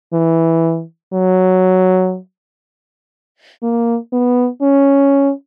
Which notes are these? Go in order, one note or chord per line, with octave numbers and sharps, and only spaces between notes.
E3
F#3
A#3
B3
C#4